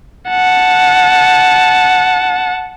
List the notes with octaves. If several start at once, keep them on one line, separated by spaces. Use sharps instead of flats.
F#5 A5